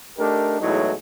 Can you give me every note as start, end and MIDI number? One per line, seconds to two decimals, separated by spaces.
0.18 0.59 57
0.18 0.59 62
0.18 0.59 63
0.18 0.59 67
0.18 0.59 70
0.60 0.93 40
0.60 0.93 45
0.60 0.93 54
0.60 0.93 56
0.60 0.93 57
0.60 0.93 63